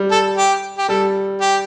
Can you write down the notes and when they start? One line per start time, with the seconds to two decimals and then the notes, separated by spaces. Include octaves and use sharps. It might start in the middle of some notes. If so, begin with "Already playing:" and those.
Already playing: G3
0.11 A4
0.37 G4
0.78 G4
0.88 G3 A4
1.41 G4